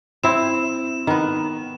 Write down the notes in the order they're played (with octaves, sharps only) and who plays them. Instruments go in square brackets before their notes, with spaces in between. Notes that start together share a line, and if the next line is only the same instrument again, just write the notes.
[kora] C4 E4 [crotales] E7
[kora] D#3 B3